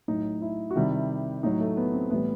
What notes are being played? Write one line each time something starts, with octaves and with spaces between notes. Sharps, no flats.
A2 F#3 D#4
E4
F#4
C3 D#3 G3 E4
A2 F#3 D#4
A3
B3
C4
A2 E3 G3 B3